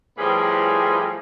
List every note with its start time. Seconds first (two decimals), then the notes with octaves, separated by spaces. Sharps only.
0.18 A2 F3 G3 G#4 B4